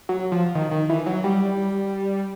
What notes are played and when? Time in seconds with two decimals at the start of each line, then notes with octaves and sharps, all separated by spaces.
0.09 F#3
0.32 F3
0.55 D#3
0.71 D#3
0.89 E3
1.06 F#3
1.24 G3